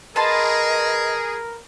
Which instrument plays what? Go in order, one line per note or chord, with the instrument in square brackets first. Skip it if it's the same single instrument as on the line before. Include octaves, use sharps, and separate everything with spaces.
[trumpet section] G#4 [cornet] A#4 [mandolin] B4 A5 C6 [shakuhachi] D#5